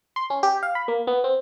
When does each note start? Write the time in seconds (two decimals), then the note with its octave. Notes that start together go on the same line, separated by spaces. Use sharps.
0.16 C6
0.30 C#4
0.43 G4
0.63 F5
0.75 B5
0.88 A#3
1.07 B3
1.24 C4